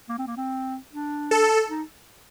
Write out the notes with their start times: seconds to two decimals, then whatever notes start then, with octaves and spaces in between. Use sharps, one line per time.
0.09 A#3
0.18 C4
0.27 A#3
0.37 C4
0.93 D4
1.31 A4
1.69 D#4